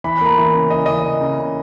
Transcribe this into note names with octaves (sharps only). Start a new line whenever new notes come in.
E3 B5
A#3 A#5
E3
C#3
E3 D#5
E3 D#5
C#3
C#3
C#3